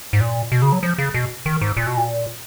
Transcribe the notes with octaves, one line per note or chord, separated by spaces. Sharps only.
G#2
A#2
B2
C#3
F#3
F3
C#3
B2
D#3
G#2
A#2
B2
A#2